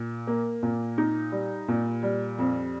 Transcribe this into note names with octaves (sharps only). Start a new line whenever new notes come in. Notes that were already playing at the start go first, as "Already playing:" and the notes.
Already playing: A#2
A#3
A#2
D#4
G3
A#2
G3
F2